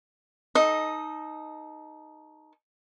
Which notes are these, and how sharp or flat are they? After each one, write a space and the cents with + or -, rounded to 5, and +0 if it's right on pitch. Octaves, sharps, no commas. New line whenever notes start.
D#4 +0 A4 -25 D#5 +0